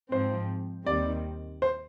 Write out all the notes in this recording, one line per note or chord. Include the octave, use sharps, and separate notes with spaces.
G#2 F3 C4 C5
D#2 D#3 G3 C4 D5
C5